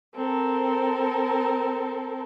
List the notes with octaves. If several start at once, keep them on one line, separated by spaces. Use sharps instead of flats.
C4 A4 A#4